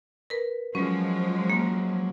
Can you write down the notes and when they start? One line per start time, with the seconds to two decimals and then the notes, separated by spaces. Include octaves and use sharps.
0.30 A#4 B4
0.75 F3 F#3 G#3 C#4
1.50 A#3